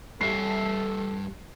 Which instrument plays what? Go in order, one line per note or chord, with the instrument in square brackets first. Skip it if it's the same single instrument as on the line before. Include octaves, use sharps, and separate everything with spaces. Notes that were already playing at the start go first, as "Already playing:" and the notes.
[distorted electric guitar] G2 E5 [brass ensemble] A4 [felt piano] C7